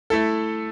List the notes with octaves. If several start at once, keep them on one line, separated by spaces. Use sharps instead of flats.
A3 E4 A4